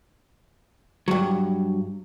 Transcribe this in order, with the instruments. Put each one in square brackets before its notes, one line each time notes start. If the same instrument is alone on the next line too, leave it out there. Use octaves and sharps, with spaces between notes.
[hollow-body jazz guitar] G2 F#3